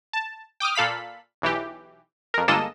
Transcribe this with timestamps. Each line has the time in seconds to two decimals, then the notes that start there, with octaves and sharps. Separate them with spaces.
0.13 A5
0.60 G5 D6 D#6 F6
0.75 A#2 A4 F5 B5 B6
1.42 B1 E3 G4
2.34 F2 A#4
2.48 G1 G#3 A#3 A4 D#5 E7